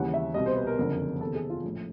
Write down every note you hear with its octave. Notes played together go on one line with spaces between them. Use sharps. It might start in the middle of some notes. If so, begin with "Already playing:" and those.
Already playing: D#2 C#3 E3 G3 F#5
E5
C2 B2 G3 D#5
C5
B4
A#4
F#1 F2 D3
E2 C3 D#3 A4
G#4
F4
A#1 A2 F3